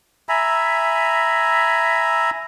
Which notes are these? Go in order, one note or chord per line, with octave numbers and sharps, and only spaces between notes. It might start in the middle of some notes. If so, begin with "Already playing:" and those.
E5 G#5 A#5 B5